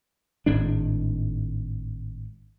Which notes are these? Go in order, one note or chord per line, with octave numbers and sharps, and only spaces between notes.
G#1 A2 G#3 D4